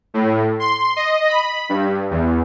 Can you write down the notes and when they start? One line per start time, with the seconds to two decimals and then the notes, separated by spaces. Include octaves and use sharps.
0.14 A2
0.60 C6
0.96 D#5
1.28 B5
1.69 G2
2.11 E2